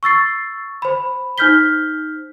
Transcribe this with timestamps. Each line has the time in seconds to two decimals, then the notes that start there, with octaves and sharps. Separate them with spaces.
0.03 C#6 E6 A6 C7
0.82 C5 B5
1.38 D#4 C5 F6 G6 B6 G7